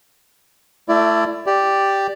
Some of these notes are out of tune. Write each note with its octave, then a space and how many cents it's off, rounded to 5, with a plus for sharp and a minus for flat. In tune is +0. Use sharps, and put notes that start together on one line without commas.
A3 +0 E4 +30 D5 +0
G4 +0 D5 +0